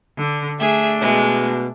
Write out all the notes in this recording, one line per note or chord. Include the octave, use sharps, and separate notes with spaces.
D3
A3 D4 G#4 E5
B2 G#3